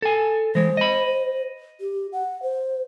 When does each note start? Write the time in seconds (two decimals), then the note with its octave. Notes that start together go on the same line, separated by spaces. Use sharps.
0.02 A4 G#5
0.55 E3 G#3 C5
0.77 D#5 B5
1.80 G4
2.13 F#5
2.43 C5